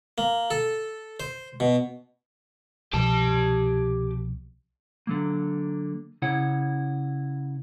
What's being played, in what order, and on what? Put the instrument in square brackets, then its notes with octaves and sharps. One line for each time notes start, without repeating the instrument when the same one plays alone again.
[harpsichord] A#3
A4
C5
B2
[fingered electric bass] C2 B2 F3 [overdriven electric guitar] G4 A5
[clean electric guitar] D3 F#3 A#3
C#3 E4 C#5 F#5